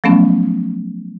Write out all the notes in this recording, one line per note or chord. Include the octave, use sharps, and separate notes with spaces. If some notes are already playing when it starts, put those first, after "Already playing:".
F3 F#3 A3 B3 C#4